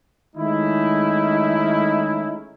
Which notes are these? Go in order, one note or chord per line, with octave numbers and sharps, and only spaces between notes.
D#3 G#3 A3 C#4 D#4 E4